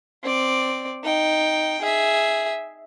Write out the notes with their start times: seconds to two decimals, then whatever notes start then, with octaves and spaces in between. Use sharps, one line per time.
0.24 C4 D5
1.04 D#4 G5
1.82 G#4 E5